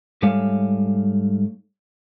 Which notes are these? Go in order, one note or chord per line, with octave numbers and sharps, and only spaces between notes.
G#2 G3 A3 C#5 F5 G#5